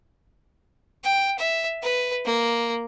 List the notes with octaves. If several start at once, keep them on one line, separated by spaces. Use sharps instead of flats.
G5
E5
B4
A#3